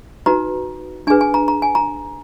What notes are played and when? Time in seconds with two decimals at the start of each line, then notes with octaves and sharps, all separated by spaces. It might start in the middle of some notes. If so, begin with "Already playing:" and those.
0.26 D#4 F#4 B4 A#5
1.07 D4 G#4 B4 G#5
1.21 G#5
1.34 A#5
1.48 A#5
1.62 G#5
1.75 A#5